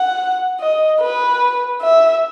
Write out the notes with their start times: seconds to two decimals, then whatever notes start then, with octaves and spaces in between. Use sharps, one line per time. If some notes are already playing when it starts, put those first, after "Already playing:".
Already playing: F#5
0.60 D#5
1.01 B4
1.82 E5